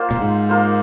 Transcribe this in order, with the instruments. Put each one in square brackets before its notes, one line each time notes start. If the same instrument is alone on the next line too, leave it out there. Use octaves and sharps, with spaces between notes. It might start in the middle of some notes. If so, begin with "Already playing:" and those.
Already playing: [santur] A#3 F4 C5
[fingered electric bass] A#2
G#2
[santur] A#3 F4 C5